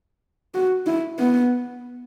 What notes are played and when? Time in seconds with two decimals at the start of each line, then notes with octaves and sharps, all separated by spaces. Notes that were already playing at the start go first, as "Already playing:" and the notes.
0.54 F#4
0.86 E4
1.19 B3